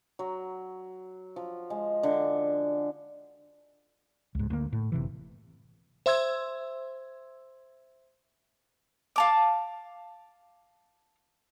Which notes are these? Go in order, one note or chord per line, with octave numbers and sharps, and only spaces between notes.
F#3
F3
G#3
D3
C#2 G#2
D2 A#3
A2
F#1 C3 E3
C5 E5 C6 E6 G#6
F5 A5 D6